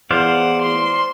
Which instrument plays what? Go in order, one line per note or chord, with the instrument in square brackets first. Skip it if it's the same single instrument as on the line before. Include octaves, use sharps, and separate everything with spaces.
[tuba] E2 [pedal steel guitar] C5 D5 F5 [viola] F#5
[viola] C6